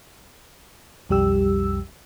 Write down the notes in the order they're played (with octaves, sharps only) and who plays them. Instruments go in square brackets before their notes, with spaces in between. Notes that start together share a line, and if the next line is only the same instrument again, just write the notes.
[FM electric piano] B1 F2 G3 G4 E6